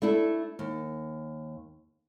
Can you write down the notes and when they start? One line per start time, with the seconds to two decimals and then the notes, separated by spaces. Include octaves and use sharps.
0.02 A3 D4 E4 A4
0.59 D#2